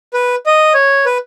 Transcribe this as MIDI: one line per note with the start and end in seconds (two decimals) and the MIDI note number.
0.14 0.36 71
0.46 0.73 75
0.74 1.05 73
1.06 1.18 71